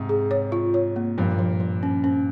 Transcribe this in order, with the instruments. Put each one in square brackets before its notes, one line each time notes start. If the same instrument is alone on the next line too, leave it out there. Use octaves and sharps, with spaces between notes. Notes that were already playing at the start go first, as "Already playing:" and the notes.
Already playing: [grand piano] G#2 C3
[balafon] G#4
C#5
F4
C#5
A#3
[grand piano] G2 A#2 [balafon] F3
[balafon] F3
F3
C#4
C#4